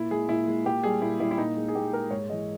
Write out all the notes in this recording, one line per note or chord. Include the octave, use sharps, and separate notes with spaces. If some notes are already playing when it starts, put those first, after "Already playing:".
Already playing: A#2 E4
G#3 G#4
A#2 E4
G#3
A#2 G4
G3 G#4
A#2 E4
G3 E4
E4
A#2 D#4
G#3
G#4
A#2 G4
G#3 A#4
G#2 C#5
E3 G#3 D#5